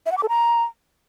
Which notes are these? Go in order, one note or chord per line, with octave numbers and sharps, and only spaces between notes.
E5
F#5
D6
A4
A#5